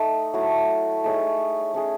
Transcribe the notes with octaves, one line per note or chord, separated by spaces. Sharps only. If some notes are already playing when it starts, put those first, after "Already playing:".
Already playing: A3 D#4 A4
F#3 A3 E4
A3 D#4 G#4 C#5
A3 C#4 G#4